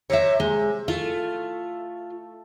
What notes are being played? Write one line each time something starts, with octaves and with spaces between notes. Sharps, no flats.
C3 C#5 E5
G#3
A3 F4